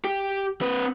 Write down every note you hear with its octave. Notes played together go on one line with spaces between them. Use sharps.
G4
C4 B4